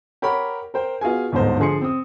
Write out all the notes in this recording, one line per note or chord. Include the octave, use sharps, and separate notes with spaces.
G4 A#4 C#5 F#5 B5
A#4 C5 G5
B3 F4 F#4 G#4 G#5
D1 G1 G#2 B2 C5
D3 F3 G#4 C6 C#7
C4 D#6